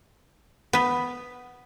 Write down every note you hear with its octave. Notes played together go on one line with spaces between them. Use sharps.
B3 B4